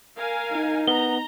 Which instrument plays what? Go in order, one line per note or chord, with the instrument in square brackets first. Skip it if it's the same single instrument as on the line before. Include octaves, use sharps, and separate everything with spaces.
[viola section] A#4 F5 G#5
[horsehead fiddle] D#4
[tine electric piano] B3 [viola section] A#5 [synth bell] G7